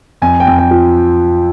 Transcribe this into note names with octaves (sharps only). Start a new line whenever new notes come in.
F2 G#5
G5
F2
G5
F3